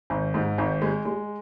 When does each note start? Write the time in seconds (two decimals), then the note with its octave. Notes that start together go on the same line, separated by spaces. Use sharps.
0.10 G#1
0.34 G#2
0.58 G#1
0.82 G#3
1.05 G#3